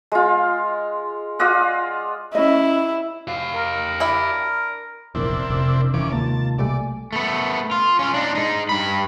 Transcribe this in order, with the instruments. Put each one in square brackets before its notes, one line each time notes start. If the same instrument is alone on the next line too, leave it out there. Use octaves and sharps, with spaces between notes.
[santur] G#3 F4
F4 D5 D#5 F#5
[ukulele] C#4 D#5 [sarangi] E4
[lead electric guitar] G4 F5
[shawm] A#4
[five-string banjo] D4 E4 E5
[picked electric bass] F1 A#1 E2 [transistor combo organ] C4 D4 E4 [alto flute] A#4
[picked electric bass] F1 [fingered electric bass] C3
[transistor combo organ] D#2 C#4 D6 [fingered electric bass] E3
[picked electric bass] D#2 [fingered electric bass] C3 G#3 A#3 [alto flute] F4 [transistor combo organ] A5
[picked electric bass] B1 G3 A3 [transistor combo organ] D5 [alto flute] G#5
[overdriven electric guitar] A3 B3
F4
C#4 F4
D4 D#4
G#3 D#4
G2 B5